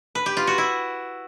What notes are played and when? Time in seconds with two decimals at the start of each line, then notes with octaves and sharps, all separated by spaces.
0.15 B4
0.26 G4
0.37 F4
0.47 F#4
0.58 E4